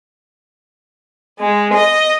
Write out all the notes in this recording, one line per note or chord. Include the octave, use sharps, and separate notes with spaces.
G#3
D#5